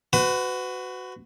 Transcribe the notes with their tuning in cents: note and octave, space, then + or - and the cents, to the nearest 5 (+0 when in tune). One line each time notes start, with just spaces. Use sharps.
F#4 +0 B4 +30